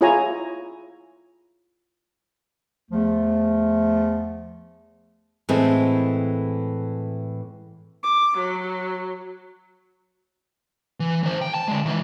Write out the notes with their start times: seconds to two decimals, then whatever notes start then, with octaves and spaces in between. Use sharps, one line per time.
0.01 E4 F4 G#4 C#5 G#5 A#5
2.90 E2 F3 A3
5.49 A2 E3 G#3 A3 C4
8.03 D6
8.37 F#3
11.00 E3
11.23 D#3 C5
11.42 G5
11.54 A5
11.68 D3 G#3
11.86 D#3 E3